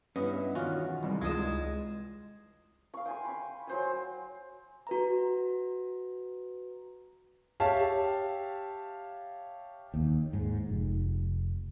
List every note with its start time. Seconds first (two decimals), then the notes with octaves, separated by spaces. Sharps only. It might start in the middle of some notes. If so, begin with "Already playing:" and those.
0.16 G2 B3 C#4 E4 D#5
0.55 E2 B2 D#3 C#4 F4 F#4
1.03 C2 G3 G#3
1.22 C#2 G#3 F4 D#6 E7
2.94 F5 C#6
3.05 G5 G#5 C6
3.25 B5 C#6
3.67 F#3 C5 G#5
4.87 F#4 B4 A#5
7.60 G4 C#5 E5 F5 A5
9.94 D#2
10.33 G#2
10.69 F1